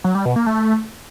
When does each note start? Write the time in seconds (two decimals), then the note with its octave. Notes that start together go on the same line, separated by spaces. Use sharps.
0.04 F#3
0.15 G3
0.25 B2
0.36 A#3
0.46 A3